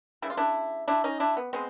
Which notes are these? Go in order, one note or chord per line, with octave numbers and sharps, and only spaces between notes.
C#3 E3 G3 E4
F4
D4 E4
D4 E4
C#4 D#4
D4 E4
B3
G#3 B3 C4